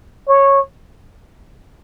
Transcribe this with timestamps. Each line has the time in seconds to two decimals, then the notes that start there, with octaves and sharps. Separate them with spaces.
0.28 C#5